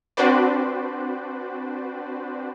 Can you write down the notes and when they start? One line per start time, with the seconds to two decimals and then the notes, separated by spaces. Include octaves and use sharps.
0.17 C4 D4 F#4 B4 C5 D5